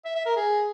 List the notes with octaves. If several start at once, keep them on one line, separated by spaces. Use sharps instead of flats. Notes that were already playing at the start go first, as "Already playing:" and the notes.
E5
E5
A#4
G#4